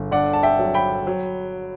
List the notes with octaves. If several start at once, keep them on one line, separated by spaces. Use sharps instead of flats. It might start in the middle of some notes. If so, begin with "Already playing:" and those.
Already playing: G1
D3 D5 F#5
A5
E5 G5
F#3
G5 B5
F#3